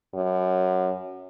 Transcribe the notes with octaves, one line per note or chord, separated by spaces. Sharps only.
F#2